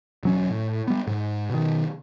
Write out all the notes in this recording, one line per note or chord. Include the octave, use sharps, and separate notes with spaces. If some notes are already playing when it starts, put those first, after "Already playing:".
E1 F#3 C#4
A2
G3 B3
G#2
B2 D#3